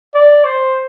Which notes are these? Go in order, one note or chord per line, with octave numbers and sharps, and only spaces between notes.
D5
C5